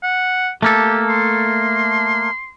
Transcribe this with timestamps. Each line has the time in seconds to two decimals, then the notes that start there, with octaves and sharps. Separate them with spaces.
0.03 F#5
0.63 A3 A#3 G4 A4
1.09 C6